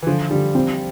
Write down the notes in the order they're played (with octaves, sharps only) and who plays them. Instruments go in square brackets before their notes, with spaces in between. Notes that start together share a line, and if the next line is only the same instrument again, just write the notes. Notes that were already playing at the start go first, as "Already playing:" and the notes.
[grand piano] E3
[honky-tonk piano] D3 [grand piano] F3
[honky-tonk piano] D3 [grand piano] G3
[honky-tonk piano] C4